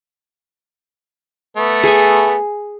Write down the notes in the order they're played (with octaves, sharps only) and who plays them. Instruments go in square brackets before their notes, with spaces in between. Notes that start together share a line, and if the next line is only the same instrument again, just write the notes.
[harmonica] A3 B3
[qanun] G#4 G#5